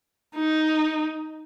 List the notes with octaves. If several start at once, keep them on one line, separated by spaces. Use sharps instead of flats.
D#4